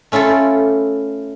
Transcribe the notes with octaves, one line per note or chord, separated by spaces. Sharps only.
A3 C#4 E4 F4 A4